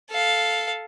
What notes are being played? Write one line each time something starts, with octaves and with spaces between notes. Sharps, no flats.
A4 F5